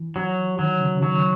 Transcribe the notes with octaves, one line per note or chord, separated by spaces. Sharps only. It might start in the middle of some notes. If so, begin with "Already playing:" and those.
Already playing: E3
F#3
D#3 F#3
C#3
C#3
D#3 F#3